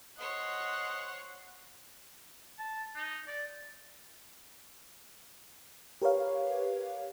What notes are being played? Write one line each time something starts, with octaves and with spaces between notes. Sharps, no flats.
C5 C#5 D#5 F#5
A5
D#4
D5
G4 A#4 B4 C#5 F5